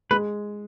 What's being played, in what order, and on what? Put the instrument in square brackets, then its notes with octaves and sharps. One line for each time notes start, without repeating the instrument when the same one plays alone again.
[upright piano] G#3 [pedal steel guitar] B4